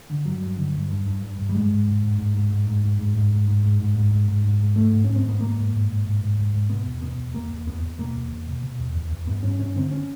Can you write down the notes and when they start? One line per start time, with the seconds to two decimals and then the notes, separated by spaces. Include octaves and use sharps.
0.10 D3
0.25 G2 F#3
0.42 G2
0.57 D3
0.74 G2
0.89 G2
1.06 G2
1.22 G2
1.38 G2
1.49 G3
1.54 G#2 G#3
1.71 G#2
1.87 G#2
2.03 G#2
2.18 G#2
2.35 G#2
2.50 G#2
2.67 G#2
2.83 G#2
2.99 G#2
3.15 G#2
3.32 G#2
3.48 G#2
3.63 G#2
3.80 G#2
3.96 G#2
4.11 G#2
4.28 G#2
4.45 G#2
4.60 G#2
4.76 G#2 A3
4.92 G#2
5.04 G#2 C#4
5.16 C4
5.25 G#2 B3
5.40 G#2 A#3
5.57 G#2
5.73 G#2
5.88 G#2
6.05 G#2
6.21 G#2
6.37 G#2
6.53 G#2
6.69 B2 B3
6.86 E2
7.02 B2 B3
7.17 E2
7.34 E2 A#3
7.50 E2
7.66 E2 B3
7.82 E2
7.98 B2 A#3
8.15 E2
8.31 E2
8.47 B2
8.62 B2
8.79 E2
8.95 E2
9.11 E2
9.27 G2 B3
9.43 G2 C#4
9.59 G2 C#4
9.76 D3 C4
9.91 C#4